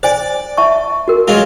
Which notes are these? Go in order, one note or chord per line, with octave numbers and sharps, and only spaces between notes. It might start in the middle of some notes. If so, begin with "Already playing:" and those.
C5 D5 G#5
E5 A5 C#6
F#4 A#4
F#3 G#3 F4